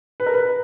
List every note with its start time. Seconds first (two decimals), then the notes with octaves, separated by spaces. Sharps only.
0.20 B4
0.26 A#4
0.34 B4